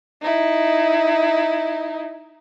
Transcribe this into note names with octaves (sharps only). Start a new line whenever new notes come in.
D#4 E4